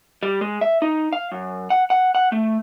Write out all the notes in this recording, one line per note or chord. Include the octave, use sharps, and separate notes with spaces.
G3
G#3
E5
D#4
F5
F#2
F#5
F#5
F#5
A3